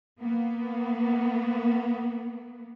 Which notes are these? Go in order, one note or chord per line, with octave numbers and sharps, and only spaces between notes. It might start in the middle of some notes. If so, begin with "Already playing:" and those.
A#3 B3